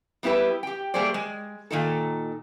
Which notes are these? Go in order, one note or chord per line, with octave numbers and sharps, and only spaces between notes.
G3 B3 E4 G4 B4
G4 G5
G3 A3 A#3 G#4 C5 D5
G#3
A#2 D#3 D#4 A4